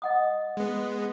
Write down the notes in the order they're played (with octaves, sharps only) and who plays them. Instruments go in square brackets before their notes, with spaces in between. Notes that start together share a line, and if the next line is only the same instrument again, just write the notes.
[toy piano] D#5 F#5 D#6
[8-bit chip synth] G#3 B3